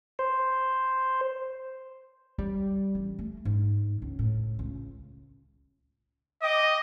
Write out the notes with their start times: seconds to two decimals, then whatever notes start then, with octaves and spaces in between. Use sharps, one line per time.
0.19 C5
2.39 G3
2.95 A1
3.19 A3
3.45 G#2
4.02 C#2
4.19 A2
4.59 C#2
6.43 D#5 G5 D6 D#6